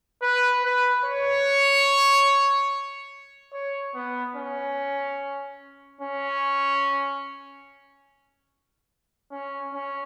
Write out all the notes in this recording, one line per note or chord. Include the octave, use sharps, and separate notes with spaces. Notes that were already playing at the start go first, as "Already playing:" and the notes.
B4
B4
C#5
C#5
B3
C#4
C#4
C#4
C#4